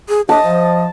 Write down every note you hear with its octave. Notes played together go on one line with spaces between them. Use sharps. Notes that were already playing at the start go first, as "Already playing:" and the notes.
G#4
A2 D4 G4 D#5 A5
F3